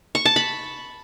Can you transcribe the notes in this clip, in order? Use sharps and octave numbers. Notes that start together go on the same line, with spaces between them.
C#6
A5
B5